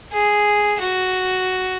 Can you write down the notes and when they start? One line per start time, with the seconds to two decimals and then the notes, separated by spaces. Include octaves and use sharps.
0.13 G#4
0.80 F#4